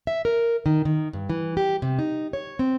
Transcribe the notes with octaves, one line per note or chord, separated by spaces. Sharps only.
E5
A#4
D#3
D#3
G2
E3
G4
C3
D#4
C#5
C4